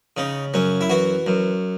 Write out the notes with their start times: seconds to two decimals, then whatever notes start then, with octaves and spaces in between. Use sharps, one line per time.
0.17 C#3 D#4
0.54 F#2 C#4
0.81 E4
0.90 E3 F#4
1.27 F#2